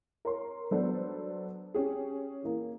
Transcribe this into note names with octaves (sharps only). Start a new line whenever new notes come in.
A#4 C#5 C6
F#3 B3 D4 A4 C5
C#4 G4 G#4
E3 A#3